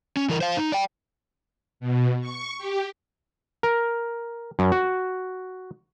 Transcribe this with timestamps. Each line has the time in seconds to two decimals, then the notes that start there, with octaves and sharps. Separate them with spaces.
0.17 C#4
0.29 E3 A#4
0.41 C5 F5
0.57 D#4
0.72 D5 G5
1.80 B2
2.21 C#6
2.58 G4
3.63 A#4
4.59 F#2
4.72 F#4